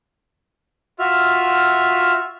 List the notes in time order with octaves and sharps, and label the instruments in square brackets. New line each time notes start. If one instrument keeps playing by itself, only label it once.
[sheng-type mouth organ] F4 F#4 E5 F6